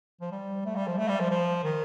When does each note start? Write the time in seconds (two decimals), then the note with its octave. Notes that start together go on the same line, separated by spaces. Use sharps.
0.21 F3
0.32 G3
0.65 A3
0.76 G3
0.87 F3
0.97 A3
1.08 G3
1.20 F3
1.30 F3
1.64 D#3